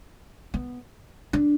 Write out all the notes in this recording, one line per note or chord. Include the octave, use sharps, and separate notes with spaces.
B3
D4